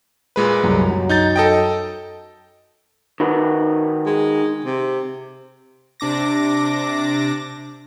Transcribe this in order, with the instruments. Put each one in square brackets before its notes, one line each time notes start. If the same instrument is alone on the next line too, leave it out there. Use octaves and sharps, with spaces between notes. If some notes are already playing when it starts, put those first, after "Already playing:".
[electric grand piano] A#2 G#3 B4
[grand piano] C2 F#2
F#2 F#3
[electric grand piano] D#4 G6 A6
A4 D#5 G5
[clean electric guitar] D#3 F#4 B4
[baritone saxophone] G#3
C3
[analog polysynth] C3 D4 D6 A#6